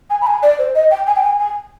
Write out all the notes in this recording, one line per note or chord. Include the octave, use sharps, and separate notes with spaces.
G#5
B5
G#5
D5
C5
D#5
G5
G#5
G5
G#5
G#5